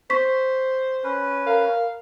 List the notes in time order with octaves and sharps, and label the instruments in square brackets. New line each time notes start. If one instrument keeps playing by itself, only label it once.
[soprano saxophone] C5 [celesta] C#6 B6
[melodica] C#4 B4
[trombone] A#4 [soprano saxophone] F5